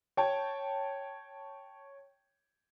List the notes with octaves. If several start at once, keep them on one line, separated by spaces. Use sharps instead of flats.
C#5 G5 A5